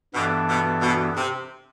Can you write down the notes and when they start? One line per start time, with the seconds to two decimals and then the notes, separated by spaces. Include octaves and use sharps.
0.14 G2 B2 E3 B3 D4 A4
0.49 B2
0.82 B2
1.17 C3